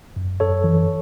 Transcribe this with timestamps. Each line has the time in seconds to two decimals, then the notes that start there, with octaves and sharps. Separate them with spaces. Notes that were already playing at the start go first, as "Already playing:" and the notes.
0.16 F#2
0.40 F#2 A4 C#5
0.64 E3